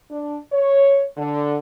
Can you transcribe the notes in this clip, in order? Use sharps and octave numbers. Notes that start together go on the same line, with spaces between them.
D4
C#5
D3